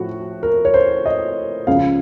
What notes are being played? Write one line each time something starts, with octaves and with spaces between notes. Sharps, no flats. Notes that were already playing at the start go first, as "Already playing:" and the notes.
Already playing: A2 F3 F#4
A#4
C#5
C5
D#5
C#2 C#3 F3 F5